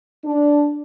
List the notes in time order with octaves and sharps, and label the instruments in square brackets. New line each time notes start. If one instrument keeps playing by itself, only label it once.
[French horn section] D4